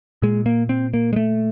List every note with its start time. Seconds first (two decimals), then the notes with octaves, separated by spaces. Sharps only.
0.22 A#2 G#3
0.46 A#3
0.69 C4
0.94 A#3
1.13 G#3
1.16 A3